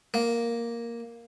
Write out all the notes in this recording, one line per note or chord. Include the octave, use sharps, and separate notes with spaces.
A#3